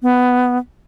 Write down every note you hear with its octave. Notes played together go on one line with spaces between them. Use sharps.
B3